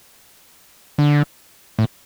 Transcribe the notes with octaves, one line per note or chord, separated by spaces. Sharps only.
D3
A2